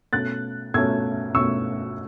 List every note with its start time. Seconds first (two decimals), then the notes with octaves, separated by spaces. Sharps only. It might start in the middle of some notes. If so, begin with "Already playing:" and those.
0.13 B2 A3 C#4 F#6 A6
0.74 B2 A3 C#4 E6 G#6
1.34 B2 A3 C#4 C#6 E6